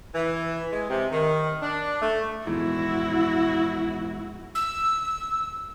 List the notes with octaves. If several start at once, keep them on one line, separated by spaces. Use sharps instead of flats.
E3
G#3
C3
D#3
D4
A3
A#1 E2 G#2 E4 F#4
E6